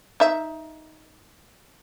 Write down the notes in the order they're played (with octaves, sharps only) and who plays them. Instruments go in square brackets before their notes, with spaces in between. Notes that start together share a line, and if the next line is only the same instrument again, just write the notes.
[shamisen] D#4 E5